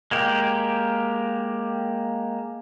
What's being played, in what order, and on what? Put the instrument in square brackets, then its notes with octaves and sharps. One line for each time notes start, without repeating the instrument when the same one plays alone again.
[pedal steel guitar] G#3 A#3 G4